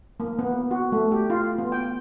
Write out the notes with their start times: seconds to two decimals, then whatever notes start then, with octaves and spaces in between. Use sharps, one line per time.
0.20 A#3
0.39 B3
0.71 F#4
0.92 A3
1.12 G4
1.30 F4
1.58 B3
1.72 G5